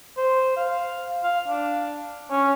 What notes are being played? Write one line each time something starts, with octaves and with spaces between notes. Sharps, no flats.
C5
F5
F5
D4
C#4